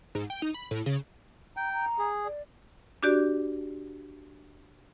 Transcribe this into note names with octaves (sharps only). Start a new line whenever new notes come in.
G#2
G5
D#4
B5
A2
C#3
G5 A#5
A#5
G#4
D5
D4 F#4 G4 D5